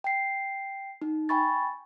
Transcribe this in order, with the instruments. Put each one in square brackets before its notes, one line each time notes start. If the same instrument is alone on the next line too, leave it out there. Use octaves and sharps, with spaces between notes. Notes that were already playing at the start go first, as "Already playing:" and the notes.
[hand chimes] G5 C7
D#4
G5 G#5 B5 C#6 A6